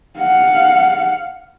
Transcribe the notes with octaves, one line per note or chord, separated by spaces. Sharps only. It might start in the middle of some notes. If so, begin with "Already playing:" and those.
F5 F#5